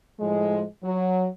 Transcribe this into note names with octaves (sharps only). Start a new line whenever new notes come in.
A2 F3 G#3
F#3